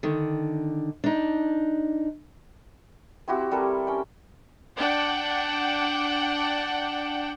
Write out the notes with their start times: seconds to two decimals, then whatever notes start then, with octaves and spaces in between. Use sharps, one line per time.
0.03 D3 D#3
1.04 D4 D#4
3.28 C4 E4 F#4 G4
3.51 G3 C4 A4 A#4
3.87 C#4 G5
4.78 D4 F#5 G5